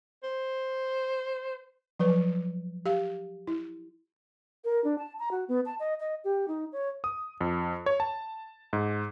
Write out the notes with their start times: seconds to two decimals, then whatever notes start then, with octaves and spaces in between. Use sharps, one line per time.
0.23 C5
1.99 F3 F#3 B4
2.86 G4 F5
3.47 E4
4.65 A#4
4.84 D4
4.98 A5
5.19 A#5
5.31 F#4
5.48 B3
5.66 A5
5.80 D#5
6.00 D#5
6.24 G4
6.48 D#4
6.72 C#5
7.04 D#6
7.41 F2
7.86 C#5
8.00 A5
8.73 G#2